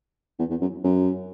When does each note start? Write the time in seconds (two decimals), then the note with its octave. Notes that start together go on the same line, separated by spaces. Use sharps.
0.39 E2
0.50 E2
0.61 F#2
0.84 F#2